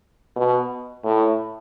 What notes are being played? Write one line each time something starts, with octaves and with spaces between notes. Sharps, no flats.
B2
A2